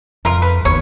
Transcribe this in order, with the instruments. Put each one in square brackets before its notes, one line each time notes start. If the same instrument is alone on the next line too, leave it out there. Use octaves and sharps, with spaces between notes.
[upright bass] F2 [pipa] F4 A#4
[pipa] B4
[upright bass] G1 D#2 [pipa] C#5